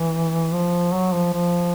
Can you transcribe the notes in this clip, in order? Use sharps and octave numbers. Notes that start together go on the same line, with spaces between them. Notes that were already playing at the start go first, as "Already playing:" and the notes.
Already playing: E3
F3
F#3
F3
F3